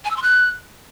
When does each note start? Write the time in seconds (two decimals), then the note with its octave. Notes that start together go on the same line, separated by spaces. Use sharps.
0.05 G#5
0.11 E6
0.17 C6
0.22 F#6